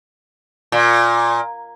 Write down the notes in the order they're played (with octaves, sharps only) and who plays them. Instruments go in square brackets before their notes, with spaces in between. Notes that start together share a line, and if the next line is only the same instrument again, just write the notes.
[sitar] A#2